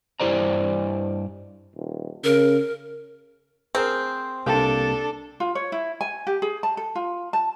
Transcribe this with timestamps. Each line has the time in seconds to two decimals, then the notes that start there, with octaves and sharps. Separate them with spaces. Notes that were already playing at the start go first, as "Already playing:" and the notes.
0.20 G2 E4 G4 C5 D5 A#5
1.76 D#1
2.24 C#3 A#4
3.75 C4 G#4 A#4 C5
4.46 C2 C3 A#3 D4 A4 G5
5.40 F4
5.55 C#5
5.72 E4
6.01 G#5
6.27 G4
6.42 G#4
6.63 A5
6.77 A4
6.95 F4
7.33 A5